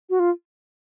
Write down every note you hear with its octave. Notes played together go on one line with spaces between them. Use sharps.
F#4
F4